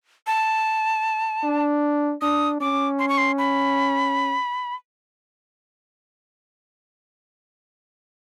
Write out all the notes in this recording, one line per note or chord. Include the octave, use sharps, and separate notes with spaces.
A5
D4
D4 D#6
C#4 D6
C6
C#6
C6
B5